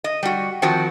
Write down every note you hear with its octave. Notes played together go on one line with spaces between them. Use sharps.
D#5
G3 F#4
D#3 F3 C4 F#4